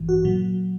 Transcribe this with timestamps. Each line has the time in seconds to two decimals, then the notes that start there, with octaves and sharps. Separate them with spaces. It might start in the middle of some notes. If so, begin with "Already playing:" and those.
Already playing: A1 G2 E3
0.09 F#4
0.24 A#2 F#3